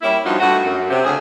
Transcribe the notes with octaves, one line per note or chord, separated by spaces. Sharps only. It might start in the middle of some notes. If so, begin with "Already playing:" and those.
G3 A#3 C#4 E4
G2 F3 D#4 F4 F#4
G2 A3 F#4
F#2
C3
D2 C#3 G#4